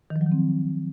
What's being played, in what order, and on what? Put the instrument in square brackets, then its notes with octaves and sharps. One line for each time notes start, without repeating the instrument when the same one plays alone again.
[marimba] D#3
F3
F#3
D#3
C4